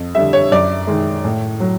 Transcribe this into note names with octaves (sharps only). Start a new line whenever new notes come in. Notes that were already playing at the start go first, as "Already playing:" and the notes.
Already playing: F2
D3 G3 E5
C#5
F#2 D5
D#3 G#3
A2
F#3